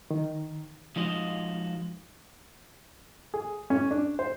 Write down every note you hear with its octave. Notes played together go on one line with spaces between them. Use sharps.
D#3
F3 G#3 D#4 F4 F#4 D#5
G#4
C#4
D4
C5